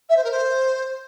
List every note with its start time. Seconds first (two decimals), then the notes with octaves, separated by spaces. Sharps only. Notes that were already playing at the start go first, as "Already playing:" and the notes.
0.09 E5
0.16 C5
0.24 A#4
0.31 C5